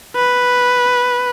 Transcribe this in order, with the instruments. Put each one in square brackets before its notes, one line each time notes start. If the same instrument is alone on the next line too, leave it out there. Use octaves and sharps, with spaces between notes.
[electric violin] B4